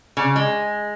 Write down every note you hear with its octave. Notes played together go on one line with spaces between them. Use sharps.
C#3
G#3